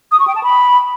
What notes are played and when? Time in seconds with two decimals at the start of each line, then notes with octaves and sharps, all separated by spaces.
0.12 D#6
0.20 C#6
0.28 G5
0.35 A5
0.43 B5